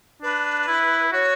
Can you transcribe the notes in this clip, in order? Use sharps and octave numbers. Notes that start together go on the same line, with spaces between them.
D4 B4
E4
F#4 C#5